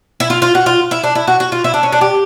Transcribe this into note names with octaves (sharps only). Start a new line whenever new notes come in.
E4
F4
F4
F#4
F4
E4
D4
E4
F#4
F#4
F4
E4
D4
C#4
D4
G4